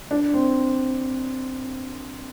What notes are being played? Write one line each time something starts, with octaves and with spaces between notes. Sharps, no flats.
D4
C4